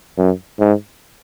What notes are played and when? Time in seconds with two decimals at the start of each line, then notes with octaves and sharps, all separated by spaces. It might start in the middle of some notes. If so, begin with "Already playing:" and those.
0.18 F#2
0.60 G#2